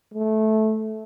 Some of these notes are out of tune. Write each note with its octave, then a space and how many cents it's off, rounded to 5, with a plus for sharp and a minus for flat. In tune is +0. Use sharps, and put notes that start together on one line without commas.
A3 -15